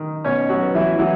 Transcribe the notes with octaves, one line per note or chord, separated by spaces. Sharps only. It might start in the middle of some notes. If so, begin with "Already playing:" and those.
Already playing: D#3
B2 C#4 C#5
F#3 F#4
B3
E3 E4
E3 F#3 E4